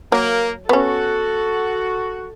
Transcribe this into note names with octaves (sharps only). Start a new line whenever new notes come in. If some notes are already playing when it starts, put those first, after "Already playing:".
F#3 A#3
B3 C#4 F#4 A4